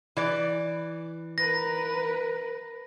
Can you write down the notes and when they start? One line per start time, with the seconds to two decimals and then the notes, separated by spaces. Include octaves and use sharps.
0.17 E3 D5
1.38 A#4 B4 A#6